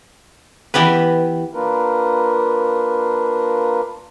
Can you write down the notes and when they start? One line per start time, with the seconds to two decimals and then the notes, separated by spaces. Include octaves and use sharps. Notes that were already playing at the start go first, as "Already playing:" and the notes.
0.74 E3 B3 G4 B4
1.54 A#3 D4 F4 A#4 B4